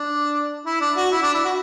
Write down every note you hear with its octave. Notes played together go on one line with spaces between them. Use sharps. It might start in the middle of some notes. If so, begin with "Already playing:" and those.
Already playing: D4
E4
D4
F#4
E4
D4
E4
F#4